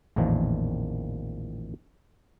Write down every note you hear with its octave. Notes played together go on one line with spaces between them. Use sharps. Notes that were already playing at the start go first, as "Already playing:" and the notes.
A1 E2 A#2 D#3 F3